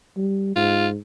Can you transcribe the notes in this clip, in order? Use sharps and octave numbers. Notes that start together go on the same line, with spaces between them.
G3
G#2 F4